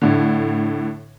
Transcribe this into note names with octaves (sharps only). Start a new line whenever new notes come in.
A2 D3